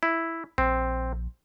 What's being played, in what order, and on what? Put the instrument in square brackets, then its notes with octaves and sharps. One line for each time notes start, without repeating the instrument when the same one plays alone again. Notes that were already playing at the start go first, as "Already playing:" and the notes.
[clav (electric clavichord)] E4
[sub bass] A#1 [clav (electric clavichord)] C4